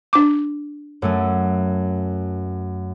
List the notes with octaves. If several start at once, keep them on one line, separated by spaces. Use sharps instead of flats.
D4 D6
F#2 A3 C#4